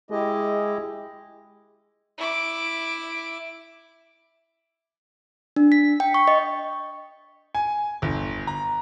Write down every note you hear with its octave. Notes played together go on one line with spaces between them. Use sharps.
G#3 E4 G4 D#5
E4 D6
D4
B6
G5
C#6
D#5
G#5
G1
A#5